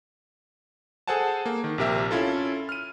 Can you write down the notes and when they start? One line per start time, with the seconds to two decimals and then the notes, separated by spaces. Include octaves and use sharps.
1.07 G#4 A4 C5 F#5 G#5 A5
1.46 A#3
1.64 D#3
1.78 A#1 C3 G4 A#4 E5
2.11 C#4 E4 F4 A4
2.69 F6 D#7